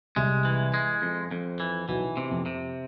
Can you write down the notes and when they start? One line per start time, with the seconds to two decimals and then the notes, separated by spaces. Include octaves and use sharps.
0.16 C2 C3 G#3
0.45 E3
0.74 G#3
1.02 F2
1.31 F2
1.60 E3
1.88 B1 B2 E3
2.17 C3
2.31 F2
2.46 C3